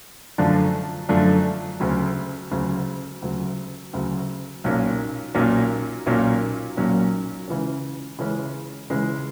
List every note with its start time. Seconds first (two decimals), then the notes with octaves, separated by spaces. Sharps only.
0.38 F#2 D3 F3 A3 D4
1.09 F#2 D3 F3 A3 D4
1.80 D2 C#3 F#3
2.51 D2 C#3 F#3
3.22 D2 C#3 F#3
3.93 D2 C#3 F#3
4.64 B1 A#2 F#3 A#3 C#4
5.34 B1 A#2 F#3 A#3 C#4
6.06 B1 A#2 F#3 A#3 C#4
6.77 B1 A#2 F#3 A#3 C#4
7.48 C#3 E3 G#3 C#4
8.19 C#3 E3 G#3 C#4
8.90 C#3 E3 G#3 C#4